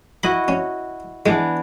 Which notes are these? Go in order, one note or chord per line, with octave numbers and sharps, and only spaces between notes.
E4 F#4 D#5 B5
C#4
E3 G#3 B3 D4